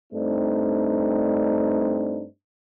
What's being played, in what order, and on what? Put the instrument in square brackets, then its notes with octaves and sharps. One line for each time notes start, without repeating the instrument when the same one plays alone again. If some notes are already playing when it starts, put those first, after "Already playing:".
[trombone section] G2 A3 C4 D4 D#4